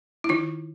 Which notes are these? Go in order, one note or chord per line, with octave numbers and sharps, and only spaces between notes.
E4
D#3 D#4 F4